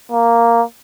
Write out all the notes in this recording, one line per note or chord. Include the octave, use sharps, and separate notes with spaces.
A#3